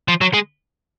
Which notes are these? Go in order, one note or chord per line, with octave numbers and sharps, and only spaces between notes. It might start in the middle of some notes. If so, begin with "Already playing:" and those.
F3
F#3
G#3